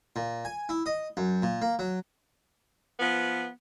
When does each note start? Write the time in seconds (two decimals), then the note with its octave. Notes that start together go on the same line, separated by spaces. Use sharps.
0.16 A#2
0.45 G#5
0.69 E4
0.86 D#5
1.17 F#2
1.43 A#2
1.62 A#3
1.79 F#3
3.00 F3 B3